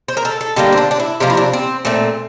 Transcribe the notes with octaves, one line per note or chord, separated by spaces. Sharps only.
C5
A#4
A4
A4
D3 G3 A#3 G4
C4
D4
D4
E4
C3 F3 A#3 D4
E4
D4
C4
A#2 A3 C4